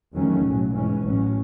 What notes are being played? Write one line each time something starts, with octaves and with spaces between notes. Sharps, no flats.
E2 D#3 F#3 A3 C#4
B1 A2 F#3
G#2 E3 G#3 C#4
A1 A2 F#3 C#4